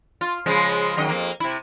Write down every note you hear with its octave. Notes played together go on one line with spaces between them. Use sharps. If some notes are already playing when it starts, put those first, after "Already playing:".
F4
C#3 F3 G#3
F#2 D#3 D#5
F2 A#3
C3 E4